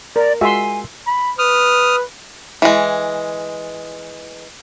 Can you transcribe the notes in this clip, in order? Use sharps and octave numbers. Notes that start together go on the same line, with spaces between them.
A#4 D5
G#3 F4 F#4 E5 G#5 C6
B5
B4 D#6 F6
E3 G#3